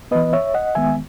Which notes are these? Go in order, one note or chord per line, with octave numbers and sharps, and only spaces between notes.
E3 B3 B4 D#5
C#5 E5
D#5 F#5
D#3 G#3 B3 E5 G#5